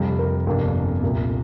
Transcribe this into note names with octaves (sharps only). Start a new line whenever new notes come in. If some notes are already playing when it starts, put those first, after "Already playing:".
Already playing: F2 C3 G3
A#4
G1 F2 C3 A#3 D4
C2 A#2 A#3